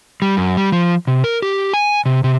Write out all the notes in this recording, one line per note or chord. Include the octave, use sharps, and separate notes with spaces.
G3
F#2
G3
F3
C3
A#4
G4
G#5
C3
C3